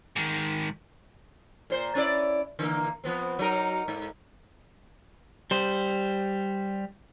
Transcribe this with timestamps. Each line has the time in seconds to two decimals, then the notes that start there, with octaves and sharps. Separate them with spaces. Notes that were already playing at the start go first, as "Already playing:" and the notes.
0.16 G#2 D#3
1.70 A#2 C5
1.95 C#4 E4 D5
2.59 D3 E3 A#3
3.04 F3 B3 C4
3.39 F#3 D#4 A#4
3.88 G#2
5.51 G3 C5